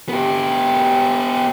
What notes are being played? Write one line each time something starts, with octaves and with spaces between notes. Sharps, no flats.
B3 G4